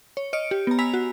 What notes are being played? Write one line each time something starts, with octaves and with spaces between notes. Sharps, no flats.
C#5
C#5 D#5 F6 C#7 D7
G4
B3 A#5
G#5 A#5 B5 E6 B6 F7
F#4